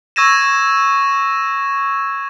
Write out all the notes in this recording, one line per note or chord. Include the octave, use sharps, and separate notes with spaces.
C#6 E6 G#6 A#6 D#7 E7